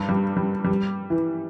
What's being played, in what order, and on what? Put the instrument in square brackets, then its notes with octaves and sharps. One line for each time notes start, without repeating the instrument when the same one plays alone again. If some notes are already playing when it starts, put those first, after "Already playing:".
Already playing: [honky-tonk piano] G2
G3
G3
G3
E3